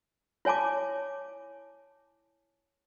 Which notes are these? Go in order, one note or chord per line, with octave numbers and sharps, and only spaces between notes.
E4 C#5 G#5 A5 D6